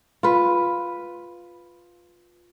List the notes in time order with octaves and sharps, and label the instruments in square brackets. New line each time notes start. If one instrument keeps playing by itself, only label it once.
[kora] F4 B4